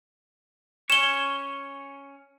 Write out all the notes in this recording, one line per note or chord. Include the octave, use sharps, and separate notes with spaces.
C#4 C#5 E7 G7